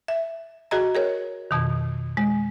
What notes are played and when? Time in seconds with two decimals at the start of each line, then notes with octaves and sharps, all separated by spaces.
0.08 E5
0.71 F#4 G#4 D#5 A#5
0.95 G#4 A#4 C#5
1.51 F2 B2 D#3
2.17 G#3